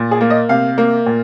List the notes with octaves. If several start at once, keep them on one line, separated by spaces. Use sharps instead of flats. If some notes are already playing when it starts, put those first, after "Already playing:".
Already playing: A#2
G#4
A#3
D#5
C3 F5
A#3
A#2